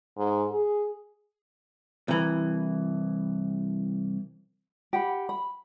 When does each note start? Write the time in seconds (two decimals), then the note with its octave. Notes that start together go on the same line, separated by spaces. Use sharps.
0.17 G#2
0.51 G#4
2.08 C2 E3
4.93 G4 F#5 B5
5.29 B5